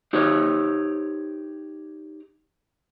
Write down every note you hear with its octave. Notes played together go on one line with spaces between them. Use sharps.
D#4 G4 C5 C#5